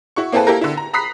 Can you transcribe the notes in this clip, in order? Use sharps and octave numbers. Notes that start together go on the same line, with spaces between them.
E4 F#4 C#6
A#3 C4 E4 G#4 A4 B4
A#3 E4 G4 A4 A#4
D3 E4
A#5
A#5 B5 D#6 F#6 B6 C7